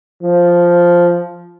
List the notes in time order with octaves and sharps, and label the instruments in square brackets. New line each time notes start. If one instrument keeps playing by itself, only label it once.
[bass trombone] F3